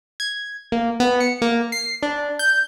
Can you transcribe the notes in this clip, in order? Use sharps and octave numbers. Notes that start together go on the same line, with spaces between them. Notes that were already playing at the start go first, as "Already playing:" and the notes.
G#6
A#3
B3
C#7
A#3
C7
D4
G6